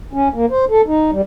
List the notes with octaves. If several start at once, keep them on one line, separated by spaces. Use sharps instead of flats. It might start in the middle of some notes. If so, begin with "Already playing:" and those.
C#4
A#3
C5
A4
D#4
G3